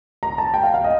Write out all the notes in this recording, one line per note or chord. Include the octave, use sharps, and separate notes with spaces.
A#5
A5
G5
F5
F5
D#5